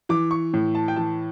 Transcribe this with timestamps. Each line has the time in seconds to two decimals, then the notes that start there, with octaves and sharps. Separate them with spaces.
0.09 E3 D6
0.31 C#6
0.54 A2
0.75 A5
0.88 G5
0.96 E3 A5